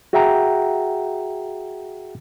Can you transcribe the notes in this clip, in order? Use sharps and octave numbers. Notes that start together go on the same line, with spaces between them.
F#4 G#4 E5 F#5 G5 A#5